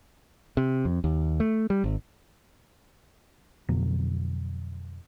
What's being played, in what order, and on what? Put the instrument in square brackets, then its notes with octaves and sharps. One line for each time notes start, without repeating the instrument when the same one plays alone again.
[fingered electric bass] C3
F2
D#2
A3
G3
G#1
F2 B2 D3 F#3